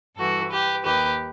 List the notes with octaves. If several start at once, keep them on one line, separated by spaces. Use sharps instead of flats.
G2 E3 F#4 A4
G4 B4
D#2 D#3 G4 B4